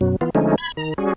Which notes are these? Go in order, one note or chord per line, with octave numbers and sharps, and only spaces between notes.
F#2 B2 F#3
E3 B3 F4
D3 F3 G#3 A3 C#4 D#4
B5 G#6
D#3 A#5
G3 C#4 F#4 G#4